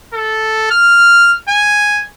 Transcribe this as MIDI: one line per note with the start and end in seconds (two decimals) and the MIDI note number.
0.14 0.68 69
0.71 1.35 89
1.49 2.04 80